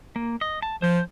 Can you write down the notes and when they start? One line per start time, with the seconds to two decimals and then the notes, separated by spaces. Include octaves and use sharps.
0.16 A#3
0.41 D#5
0.62 A5
0.82 F3 C5 G6